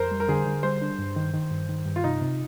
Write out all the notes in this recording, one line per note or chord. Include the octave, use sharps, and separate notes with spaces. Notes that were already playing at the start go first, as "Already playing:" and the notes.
Already playing: F2 A#4 C5
G3
A#4
D3 G#4
D3
G3 C5
D4
G2
D#3
D#3
G2
D#3
G2
F4
C3 D#4
C3